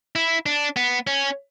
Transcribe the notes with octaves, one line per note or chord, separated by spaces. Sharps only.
E4
D4
B3
C#4